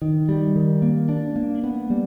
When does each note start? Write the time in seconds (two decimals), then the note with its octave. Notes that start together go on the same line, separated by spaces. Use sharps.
0.02 D#3
0.29 G3
0.56 D#3
0.82 A#3
1.09 D4
1.36 A#3
1.64 B3
1.90 G3